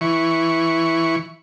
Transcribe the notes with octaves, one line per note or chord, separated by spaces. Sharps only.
E3 C#6